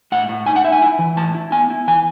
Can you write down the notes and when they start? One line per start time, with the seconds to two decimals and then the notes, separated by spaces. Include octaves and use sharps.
0.12 A2 F#5
0.29 A2
0.46 D#4 G#5
0.56 F#5
0.64 D#4 E5
0.72 G#5
0.82 E4
0.99 E3
1.17 A2 A5
1.34 E4
1.52 B3 G#5
1.70 E4
1.88 E3 G#5